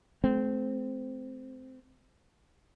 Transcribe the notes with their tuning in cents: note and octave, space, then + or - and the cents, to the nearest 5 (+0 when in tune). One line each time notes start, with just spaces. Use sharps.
A3 -45 C4 -15